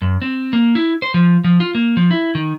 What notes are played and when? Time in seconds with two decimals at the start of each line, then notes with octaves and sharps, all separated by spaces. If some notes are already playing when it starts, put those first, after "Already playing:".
0.02 F#2
0.22 C4
0.53 A#3
0.75 E4
1.02 C5
1.14 F3
1.44 F3
1.60 F4
1.75 A#3
1.97 F3
2.11 E4
2.35 D#3